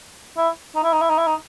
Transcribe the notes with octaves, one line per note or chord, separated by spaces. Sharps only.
E4
D#4
E4
D#4
E4
D#4
E4
D#4